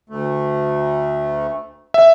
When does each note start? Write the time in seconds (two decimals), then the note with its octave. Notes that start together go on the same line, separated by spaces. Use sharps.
0.09 D2 A3
1.94 E5